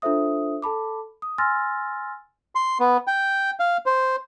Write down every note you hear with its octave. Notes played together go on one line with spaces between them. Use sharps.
D4 F4 A4 C5 E5 D#6
A4 A5 B5 D6
D#6
G#5 C6 E6 F6 A6 A#6
C6
B3
G5
F5
C5